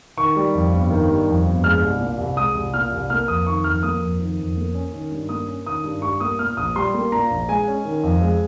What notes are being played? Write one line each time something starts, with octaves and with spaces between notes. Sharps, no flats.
D#3 C#6
G3
F2
G1
D#3
G3
F2
G1
G#3 F6
C2
A#2
C2
G#3 D#6
C2
A#2 F6
C2
A#3 F6
F2 D#6
D#3 C#6
F2 F6
A#3 D#6
F2
D#3
F2
A#3
C#4
D#3
G2
A#3 D#6
C#4
D#3 D#6
G2
G3 C#6
A#3 D#6
A#2 F6
A#1 D#6
G3 C6
A#3
A#2 A#5
A#1
G#3 G#5
C#4
D#3
F2
G#3